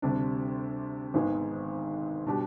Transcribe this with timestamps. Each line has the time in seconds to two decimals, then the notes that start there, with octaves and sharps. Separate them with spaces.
0.02 D2 C3 G3 D4
1.14 G#1 G#2 D#3 G#3 B3
2.26 B2 G3 D4 G4